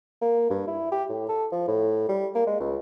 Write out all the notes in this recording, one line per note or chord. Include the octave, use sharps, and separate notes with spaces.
A#3
G2
E4
G4
A2
A4
F3
A2
G3
A#3
G#3
C#2